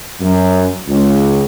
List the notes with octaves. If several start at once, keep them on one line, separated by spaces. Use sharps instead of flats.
F#2
C#2